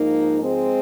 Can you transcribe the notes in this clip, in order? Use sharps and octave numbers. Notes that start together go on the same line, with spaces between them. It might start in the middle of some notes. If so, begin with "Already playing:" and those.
Already playing: G#2 F3 A#3 D#4
G#3 C4